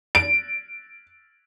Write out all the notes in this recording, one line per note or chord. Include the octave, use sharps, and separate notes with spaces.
D7